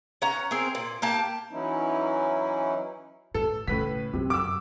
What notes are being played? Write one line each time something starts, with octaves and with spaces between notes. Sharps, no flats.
C#4 F#5 A#5
C4 G#4 A#4
A#2
A#3 G4 A5
E3 F#3 C#4 D#4 E4
A2 A4
A2 C#3 B4 B6
F#2 C3
D6 E6